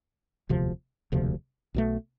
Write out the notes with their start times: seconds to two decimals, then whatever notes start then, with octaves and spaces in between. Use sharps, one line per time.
0.49 E1 D2 C3 F3
1.12 E1 D2 C3 F3
1.74 B1 B2 A3